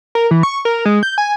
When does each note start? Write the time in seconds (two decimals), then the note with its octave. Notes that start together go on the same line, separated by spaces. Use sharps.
0.15 A#4
0.31 E3
0.43 C#6
0.65 A#4
0.85 G#3
1.03 G6
1.18 G#5